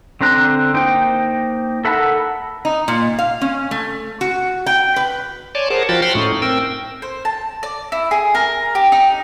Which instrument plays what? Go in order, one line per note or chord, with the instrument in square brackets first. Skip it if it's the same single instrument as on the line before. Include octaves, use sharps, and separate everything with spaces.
[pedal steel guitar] D3 C4 C5 A#5 F#6
A#3 D#4 C5 G5
A4 A#4 E5 F#5 B5
[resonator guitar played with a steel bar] D#4
A#2
F5
C#4
A3
F#4
G5
B4
[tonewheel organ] C#5 D5 G#5 A5 C6 D6
G#4 A#4 C5 F#5 A5
F3 F4 F#4 G5 B5 A6
C5 F#5 G5 B5 C6 F6
A2 A3 C#4 D#4
C4 A#4 G5 E6
[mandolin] C5
A5
D5
E4
G#4
A#4
G4
D#4